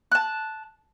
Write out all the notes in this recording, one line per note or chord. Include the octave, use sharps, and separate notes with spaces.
A5 F#6